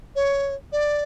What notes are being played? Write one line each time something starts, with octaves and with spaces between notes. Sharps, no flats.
C#5
D5